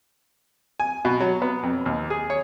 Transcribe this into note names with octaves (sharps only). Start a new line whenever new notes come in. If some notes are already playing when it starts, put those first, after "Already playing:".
G#5
B2
F#3
B3
F2
D#2
G#4
C#5